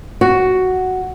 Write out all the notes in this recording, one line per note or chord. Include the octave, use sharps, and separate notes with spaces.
F#4